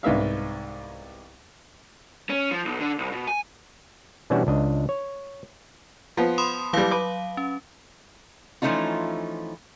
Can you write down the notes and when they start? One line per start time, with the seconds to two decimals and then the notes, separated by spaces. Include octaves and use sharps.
0.03 C2 G#2 B3 E5 F5
2.30 C#4
2.51 F3
2.65 B1
2.80 D3
2.98 C2
3.12 B2
3.28 G#5
4.30 B2 E3 G3 C#4 D4 F#4
4.47 C#2 D4 D#5
4.89 C#5
6.17 F3 B3
6.38 B5 C6 D#6
6.73 E3 F#3 G3 F5
6.91 B4 D6
7.37 C#4
8.62 E3 F3 A3 C#4 D#4 F4